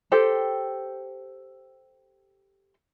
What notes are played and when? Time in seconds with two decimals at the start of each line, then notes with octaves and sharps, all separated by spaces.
0.12 G4 A4 C5 G5